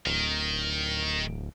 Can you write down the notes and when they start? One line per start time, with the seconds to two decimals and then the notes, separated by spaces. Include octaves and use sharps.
0.06 D1 D#3